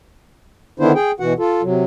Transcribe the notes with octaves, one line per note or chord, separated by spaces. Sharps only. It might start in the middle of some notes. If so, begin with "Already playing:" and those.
D3 D#3 B3 D4 E4 C5
G#4 G5
B2 E3 F#4 F#5
F4 A4
C3 F#3